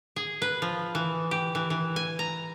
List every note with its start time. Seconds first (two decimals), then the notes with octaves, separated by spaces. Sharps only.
0.16 G#4
0.42 B4
0.62 F3
0.95 E3
1.31 G4
1.55 E3
1.70 E3
1.96 G#5
2.19 A#5